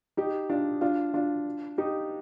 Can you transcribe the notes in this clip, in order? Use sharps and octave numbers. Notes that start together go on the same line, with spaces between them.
D#4 G4
D4 F4
D4 F4
D4 F4
D#4 G4